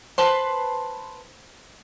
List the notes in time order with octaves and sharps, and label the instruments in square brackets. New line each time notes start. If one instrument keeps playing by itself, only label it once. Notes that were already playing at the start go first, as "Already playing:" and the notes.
[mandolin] B4 A5 C6 [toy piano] C5